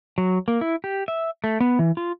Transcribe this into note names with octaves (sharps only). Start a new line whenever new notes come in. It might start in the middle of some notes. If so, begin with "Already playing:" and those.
F#3
A#3
E4
G4
E5
A3
B3
E3
F4